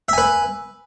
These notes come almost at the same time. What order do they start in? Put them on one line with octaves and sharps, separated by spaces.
E5 G#5 B4